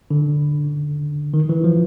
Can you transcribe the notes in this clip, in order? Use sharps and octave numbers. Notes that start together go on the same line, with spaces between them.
D3
D#3
E3
F3